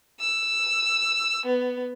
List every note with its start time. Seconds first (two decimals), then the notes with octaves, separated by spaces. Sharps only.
0.20 E6
1.45 B3